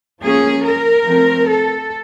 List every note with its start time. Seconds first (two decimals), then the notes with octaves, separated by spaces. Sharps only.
0.22 F3 A#3 C#4 G#4
0.64 A#4
1.06 F3 A3 C4
1.47 A4